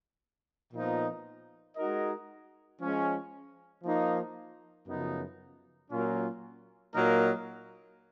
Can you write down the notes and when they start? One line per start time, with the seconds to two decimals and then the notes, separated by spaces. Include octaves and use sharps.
0.72 A#2 F3 B3 D#4
1.76 G#3 D#4 F#4 A#4 D#5
2.79 F3 G#3 C#4
3.83 F3 A#3 D#4
4.87 F#2 C#3 F3 B3 D#4
5.91 A#2 F#3 A#3 C#4 F4
6.94 A#2 F#3 A#3 D#4 A#4